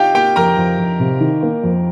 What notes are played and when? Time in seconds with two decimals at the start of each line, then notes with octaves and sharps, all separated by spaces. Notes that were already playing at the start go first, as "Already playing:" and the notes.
Already playing: D#4 F4 G4 F5 G5
0.14 A#3 G4 G5
0.36 F2 A#4 A#5
0.57 F2
0.78 F2
1.00 C3
1.21 D#3
1.43 A#3
1.63 F2